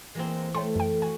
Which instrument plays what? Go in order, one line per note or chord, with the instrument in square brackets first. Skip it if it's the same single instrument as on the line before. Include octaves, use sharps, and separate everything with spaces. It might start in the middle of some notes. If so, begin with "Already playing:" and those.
[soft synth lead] E3 [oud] G#3 A#3 C4
[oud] A3 [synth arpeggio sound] C#5 G5 C6
[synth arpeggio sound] F#2 G5
[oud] F#4 [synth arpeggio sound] G#5